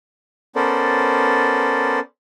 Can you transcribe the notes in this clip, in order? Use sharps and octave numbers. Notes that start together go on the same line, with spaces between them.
B3 C#4 A4 A#4 C5 D5